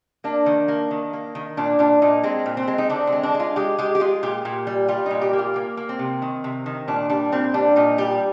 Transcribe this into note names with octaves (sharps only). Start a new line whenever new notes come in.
A#3 D4
D#3
A#3
D#3
A#3
D#3
A#2 D4
A#2 D4
A#2 D#4
G#3 C4
A#2
C4
G#3
D#4
D3 D4
C4
G#3
D4
G#3
F4
G#3 G4
G#3 G4
G4
G#3 F4
A#2 G4
A#2
G3
G3 F4
A#2 D#4
G4
A#3
F4
A#3
A#3
C4
C3
D#3
C3
D#3
A#2 D4
G3 D4
A#2 C4
G3 D4
A#2 D#4
G3 G4